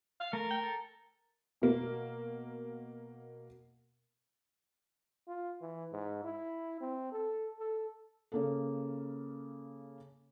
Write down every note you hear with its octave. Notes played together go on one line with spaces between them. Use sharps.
F5
A3 A#4
G5
A4
B2 A#3
F4
E3
G#2
E4
C4
A4
A4
C#3 A#3 A4